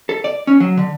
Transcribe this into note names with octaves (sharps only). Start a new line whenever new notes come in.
A4
D5
C#4
F#3
D3